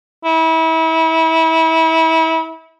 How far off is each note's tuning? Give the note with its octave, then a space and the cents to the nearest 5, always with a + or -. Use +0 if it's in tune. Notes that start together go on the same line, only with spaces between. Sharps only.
E4 -30